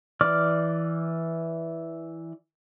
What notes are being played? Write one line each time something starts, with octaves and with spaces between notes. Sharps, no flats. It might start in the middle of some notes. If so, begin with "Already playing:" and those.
E3 D5 D6 F6